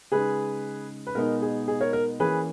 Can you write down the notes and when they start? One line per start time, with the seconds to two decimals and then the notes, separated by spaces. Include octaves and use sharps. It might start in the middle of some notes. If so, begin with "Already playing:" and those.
0.12 C#3 G#3 D#4 G#4 B4
1.07 B4
1.15 B2 G#3 B3 D#4 A#4
1.42 G#4
1.68 G#4
1.81 A#4 C#5
1.93 A#4
2.20 E3 A#3 C#4 G#4 B4